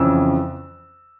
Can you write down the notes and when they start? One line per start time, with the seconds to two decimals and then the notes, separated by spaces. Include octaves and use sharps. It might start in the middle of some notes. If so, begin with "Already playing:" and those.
Already playing: F2 C#3 E3 E6